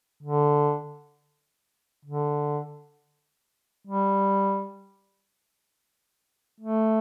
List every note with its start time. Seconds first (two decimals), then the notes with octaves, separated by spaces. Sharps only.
0.23 D3
2.05 D3
3.87 G3
6.60 A3